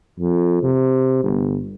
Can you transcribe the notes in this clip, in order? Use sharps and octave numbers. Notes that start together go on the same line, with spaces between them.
F2
C3
G1